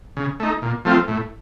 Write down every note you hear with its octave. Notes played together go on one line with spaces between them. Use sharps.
C#3
A3 D#4
A#2
F3 A3 C4 F4
A2